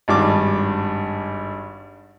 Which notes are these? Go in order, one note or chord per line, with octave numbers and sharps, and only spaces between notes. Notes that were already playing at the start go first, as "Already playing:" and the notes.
G#1 G2 D6